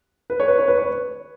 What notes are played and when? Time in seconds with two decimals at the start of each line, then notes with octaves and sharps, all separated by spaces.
0.30 B4
0.40 C#5
0.48 B4
0.58 C#5
0.68 B4
0.78 C#5